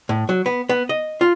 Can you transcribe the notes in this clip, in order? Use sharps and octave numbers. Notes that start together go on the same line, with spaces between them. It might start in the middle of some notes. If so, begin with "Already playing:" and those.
A2
F#3
B3
B3
D#5
F4